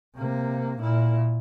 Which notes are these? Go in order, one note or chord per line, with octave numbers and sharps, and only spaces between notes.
C3 A#3
A#2 E4